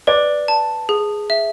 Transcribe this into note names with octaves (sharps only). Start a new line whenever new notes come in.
B4 D5
A5
G#4
E5